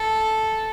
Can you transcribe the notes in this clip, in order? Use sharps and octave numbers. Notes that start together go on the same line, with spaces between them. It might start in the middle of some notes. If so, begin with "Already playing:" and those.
Already playing: A4